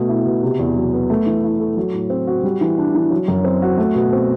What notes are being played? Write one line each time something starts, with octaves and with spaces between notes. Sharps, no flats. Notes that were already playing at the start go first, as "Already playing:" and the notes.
Already playing: B2 A3
E4
B2
C3
E2
F#3
B3
A3
E3
E4
A4
F#3
A2
C4
F#4
G3
E3
D4
E3
F#3
F#2
C4
F#4
A3
B2
C4